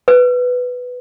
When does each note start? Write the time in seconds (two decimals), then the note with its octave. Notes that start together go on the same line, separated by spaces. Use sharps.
0.08 B4